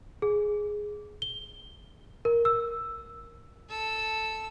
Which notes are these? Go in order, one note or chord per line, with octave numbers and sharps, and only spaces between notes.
G#4
G7
A#4
E6
A4 E6